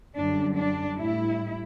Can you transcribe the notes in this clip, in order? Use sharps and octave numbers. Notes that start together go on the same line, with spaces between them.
F#2 D3 G3 D4
D4
A2 G3 E4